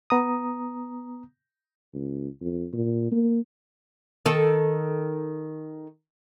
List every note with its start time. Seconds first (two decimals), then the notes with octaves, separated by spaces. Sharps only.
0.10 B3 A#5 D#6
1.93 C#2
2.41 F2
2.73 A#2
3.12 A#3
4.26 D#3 A4